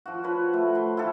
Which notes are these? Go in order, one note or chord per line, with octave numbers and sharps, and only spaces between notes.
F3 F#4
B4 C#5
A3
B5 C6
E4 F4 G4 A4